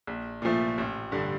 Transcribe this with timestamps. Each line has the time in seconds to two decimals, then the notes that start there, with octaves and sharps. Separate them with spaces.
0.07 A#1
0.42 A#2 F3 A3
0.78 A1
1.12 G2 D3